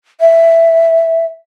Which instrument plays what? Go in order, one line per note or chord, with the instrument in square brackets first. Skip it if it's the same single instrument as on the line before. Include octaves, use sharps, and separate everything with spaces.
[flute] E5